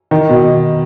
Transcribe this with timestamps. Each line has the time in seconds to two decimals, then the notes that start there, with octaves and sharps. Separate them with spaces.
0.11 D#3
0.30 B2